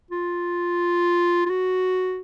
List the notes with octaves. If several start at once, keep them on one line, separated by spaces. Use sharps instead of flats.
F4
F4
F#4